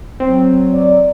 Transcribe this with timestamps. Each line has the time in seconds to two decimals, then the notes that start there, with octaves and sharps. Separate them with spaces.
0.20 F#3 C4
0.73 D5